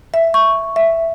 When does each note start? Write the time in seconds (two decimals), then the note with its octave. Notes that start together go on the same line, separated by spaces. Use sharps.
0.14 E5
0.34 C#6
0.76 E5